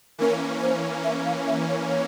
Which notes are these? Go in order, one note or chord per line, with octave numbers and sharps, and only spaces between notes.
E3 A#3 C#4 A#4
C5
E5
F5
E5
C#5
C#5